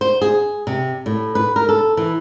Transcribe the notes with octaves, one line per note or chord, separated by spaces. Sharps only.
C5
G#4
C3
A2
B4
A#4
A4
E3